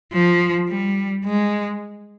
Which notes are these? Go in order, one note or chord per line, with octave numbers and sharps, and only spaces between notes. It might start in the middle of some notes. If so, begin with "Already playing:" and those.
F3
G3
G#3